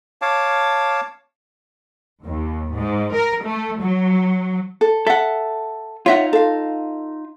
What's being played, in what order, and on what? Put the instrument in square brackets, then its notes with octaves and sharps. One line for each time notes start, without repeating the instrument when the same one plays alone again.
[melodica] C#5 F5 A5 D6
[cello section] D#2
G#2
A#4
A3
F#3
[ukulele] A4
[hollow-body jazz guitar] A4 [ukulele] E5 F#5
[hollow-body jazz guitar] D#4 F4 [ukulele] C#5 E5 F#5
[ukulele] A4 F5